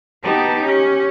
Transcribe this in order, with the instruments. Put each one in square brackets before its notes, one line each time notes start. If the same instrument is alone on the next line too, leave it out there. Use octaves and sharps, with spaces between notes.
[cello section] B3 D#4 G4 [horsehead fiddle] A5
[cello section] C#4 [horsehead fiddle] G4